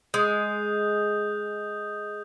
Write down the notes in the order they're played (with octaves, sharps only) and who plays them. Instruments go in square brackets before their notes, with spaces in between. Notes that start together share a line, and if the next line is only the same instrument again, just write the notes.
[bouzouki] G#3 [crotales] D#6 G6